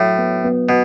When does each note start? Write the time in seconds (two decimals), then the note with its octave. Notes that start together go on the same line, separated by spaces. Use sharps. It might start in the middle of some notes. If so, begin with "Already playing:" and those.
Already playing: A2 F#3
0.18 B3
0.44 B3
0.69 B2 B3